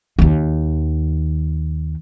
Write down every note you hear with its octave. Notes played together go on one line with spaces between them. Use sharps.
D#2 D#3